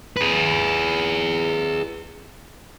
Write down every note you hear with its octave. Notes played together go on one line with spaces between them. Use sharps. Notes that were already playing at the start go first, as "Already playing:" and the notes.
G#4 B4